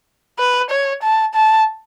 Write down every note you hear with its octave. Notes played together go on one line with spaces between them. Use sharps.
B4
C#5
A5
A5